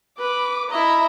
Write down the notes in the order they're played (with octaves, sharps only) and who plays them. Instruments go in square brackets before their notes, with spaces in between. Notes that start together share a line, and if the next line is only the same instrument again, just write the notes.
[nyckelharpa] B4 [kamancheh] D6
[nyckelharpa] E4 D#5 [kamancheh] E5 A#5